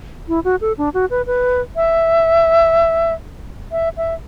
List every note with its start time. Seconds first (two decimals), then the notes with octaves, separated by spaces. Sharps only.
0.28 E4
0.44 F#4
0.61 A4
0.78 D4
0.94 F#4
1.10 B4
1.27 B4
1.76 E5
3.72 E5
3.97 E5